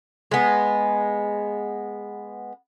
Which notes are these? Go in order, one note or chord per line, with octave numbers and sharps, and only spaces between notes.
G#3 B3